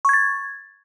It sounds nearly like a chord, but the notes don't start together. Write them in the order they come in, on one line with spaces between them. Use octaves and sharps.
C#6 G#6 A6